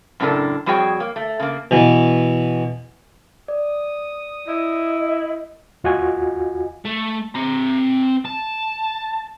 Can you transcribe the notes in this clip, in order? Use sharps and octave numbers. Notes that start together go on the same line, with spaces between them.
F#2 A2 C#3 D4 A4 A#4
F2 G3 F#4 G#4 C#5 G5
A#3
A3
C#3 A#3
B2 E3
D5 D#6
E4 D#5
D#2 F4 F#4 D#5 G#5
A3
C4 A#5
A5